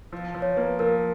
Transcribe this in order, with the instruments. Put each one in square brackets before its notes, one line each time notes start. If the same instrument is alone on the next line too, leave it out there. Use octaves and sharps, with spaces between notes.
[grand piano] F3
F3
[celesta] C#5
[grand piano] A#3 [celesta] B4
[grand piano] F3 [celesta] A#4